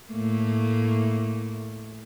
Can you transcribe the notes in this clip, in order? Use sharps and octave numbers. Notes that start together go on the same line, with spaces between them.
A2 A3 A#3